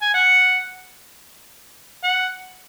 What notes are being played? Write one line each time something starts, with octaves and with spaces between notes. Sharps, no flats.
G#5
F#5
F#5